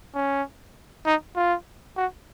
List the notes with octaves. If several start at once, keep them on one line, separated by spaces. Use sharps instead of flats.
C#4
D#4
F4
F#4